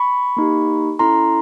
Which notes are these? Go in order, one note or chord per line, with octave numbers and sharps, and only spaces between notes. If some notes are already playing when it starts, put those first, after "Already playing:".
Already playing: B5 C#6
A#3 D#4 G4
C#4 E4 A4 A#5 C6